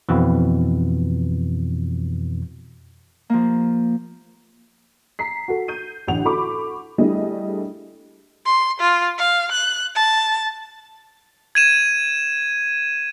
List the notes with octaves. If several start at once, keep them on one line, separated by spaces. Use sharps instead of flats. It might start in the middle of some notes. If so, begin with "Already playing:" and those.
F2 B2 E3
F3 A#3
A#5 B6 C7
F#4 A4
G6 D#7
A1 D3 F#5 F7
F#4 A4 B5 C#6 D6
G3 A3 D4 E4 G#4 D#5
C6
F4
F5
F#6
A5
G#6 D#7 E7